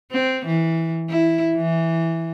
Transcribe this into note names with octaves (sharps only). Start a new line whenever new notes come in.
C4
E3
E4
E3